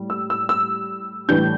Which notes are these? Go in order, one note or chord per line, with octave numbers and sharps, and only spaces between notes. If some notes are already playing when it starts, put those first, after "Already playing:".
Already playing: A2 G3
E6
E6
E6
A2 E3 G3 D4 G6